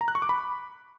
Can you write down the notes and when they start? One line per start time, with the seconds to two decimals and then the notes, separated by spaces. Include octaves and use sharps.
0.01 A#5
0.08 F#6
0.15 C#6
0.22 D6
0.29 B5